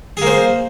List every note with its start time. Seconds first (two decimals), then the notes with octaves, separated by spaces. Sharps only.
0.17 G#4
0.22 A#3
0.26 C5